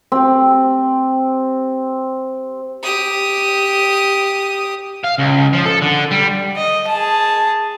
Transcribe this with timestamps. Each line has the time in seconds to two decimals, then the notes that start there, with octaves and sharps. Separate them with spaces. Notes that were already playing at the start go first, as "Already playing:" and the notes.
0.12 C4 G4
2.83 G4 D#6
5.04 F5
5.19 C#2
5.53 F3
5.65 A4
5.82 D3
6.11 G3
6.57 D#5
6.88 G#4 A5